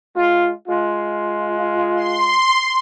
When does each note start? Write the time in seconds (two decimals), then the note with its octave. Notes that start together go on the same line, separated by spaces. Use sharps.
0.16 G#3 F4
0.68 G#3 F4
1.96 C6